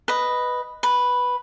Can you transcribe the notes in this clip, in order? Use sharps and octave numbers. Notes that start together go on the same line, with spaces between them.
B4 D#5
B4